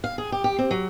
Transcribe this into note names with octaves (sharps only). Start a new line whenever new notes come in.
F5
G#4
G4
G4
C4
F#3